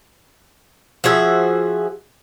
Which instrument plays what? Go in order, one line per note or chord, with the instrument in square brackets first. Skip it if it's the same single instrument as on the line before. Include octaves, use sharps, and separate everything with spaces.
[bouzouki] F3 F#4 G#4 E5